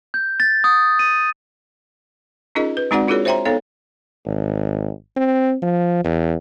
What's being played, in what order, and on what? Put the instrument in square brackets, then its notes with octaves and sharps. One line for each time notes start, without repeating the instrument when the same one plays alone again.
[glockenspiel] G6
A6
D#6
D#7
[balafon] C#4 D#4 F4 G#4 A#4 D#5
B4
G#3 C4 D#4 F#4 D5 F#5
D4 F4 F#4 G#4 A#4 C#5
C5 C#5 E5 G5 A#5 C6
B3 D#4 A4 C#5 F5
[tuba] G#1
C4
F3
E2